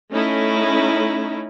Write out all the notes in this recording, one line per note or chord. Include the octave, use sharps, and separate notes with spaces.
A3 C#4 D#4 E4